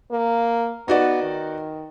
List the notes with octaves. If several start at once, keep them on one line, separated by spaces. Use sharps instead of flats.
A#3
B3 D#4 F#4 D5
D#3